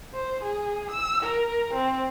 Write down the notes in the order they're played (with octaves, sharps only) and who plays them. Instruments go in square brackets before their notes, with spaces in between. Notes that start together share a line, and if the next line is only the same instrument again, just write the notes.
[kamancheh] C5
G#4
E6
A#4
C4